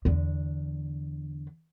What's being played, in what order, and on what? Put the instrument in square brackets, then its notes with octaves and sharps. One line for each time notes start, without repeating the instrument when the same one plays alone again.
[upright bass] E2 D3